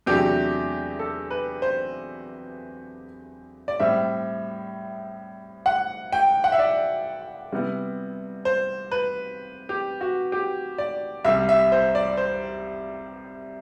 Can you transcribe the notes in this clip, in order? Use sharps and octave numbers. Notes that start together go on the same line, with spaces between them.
E2 C3 F#3 A3 D4 G4
A4
B4
C5
D5
A2 G3 C4 E5
F#5
G5
F#5
E5
D5
C3 G3 B3 E4
C5
B4
G4
F#4
G4
D5
C2 C3 G3 E5
E5
C5
D5
C5